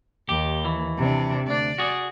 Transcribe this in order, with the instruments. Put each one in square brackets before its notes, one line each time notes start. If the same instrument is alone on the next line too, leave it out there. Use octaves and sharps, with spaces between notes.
[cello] D#2 [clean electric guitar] G4
[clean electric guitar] E3
[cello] C3 D4
[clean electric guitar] D2 D4 [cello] D5
[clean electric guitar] F#4 G#4